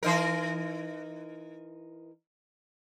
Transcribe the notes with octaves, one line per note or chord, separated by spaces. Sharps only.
E3 D#4 A#4